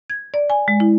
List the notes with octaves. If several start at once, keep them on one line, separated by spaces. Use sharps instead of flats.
G#6
D5
G#5
G#3
E4